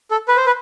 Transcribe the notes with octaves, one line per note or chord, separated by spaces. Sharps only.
A4
B4
C5
B4